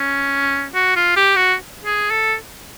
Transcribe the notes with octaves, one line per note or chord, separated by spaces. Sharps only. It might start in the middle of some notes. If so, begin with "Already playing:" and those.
Already playing: C#4
F#4
F4
G4
F#4
G#4
A4